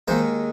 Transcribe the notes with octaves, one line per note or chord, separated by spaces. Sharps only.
D#2 D#3 G#3 C5